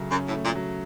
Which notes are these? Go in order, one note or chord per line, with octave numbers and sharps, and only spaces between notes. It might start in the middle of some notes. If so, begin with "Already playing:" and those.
Already playing: C#3 F#3 A3
F#2 C#4
A2
A3
A#2
F#3